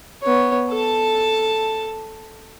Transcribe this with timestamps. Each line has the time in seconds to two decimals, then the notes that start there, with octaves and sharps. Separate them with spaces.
0.23 B3 C#5
0.69 A4 A5